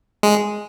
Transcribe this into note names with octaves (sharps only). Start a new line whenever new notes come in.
G#3